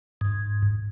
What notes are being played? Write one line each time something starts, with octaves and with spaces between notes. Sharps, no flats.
G#2